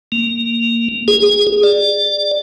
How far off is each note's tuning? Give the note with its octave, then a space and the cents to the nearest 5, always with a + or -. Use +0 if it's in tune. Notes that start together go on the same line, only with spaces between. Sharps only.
A#3 -10
G#4 -15
D5 +15